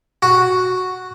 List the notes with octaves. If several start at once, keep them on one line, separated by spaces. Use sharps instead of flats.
F#4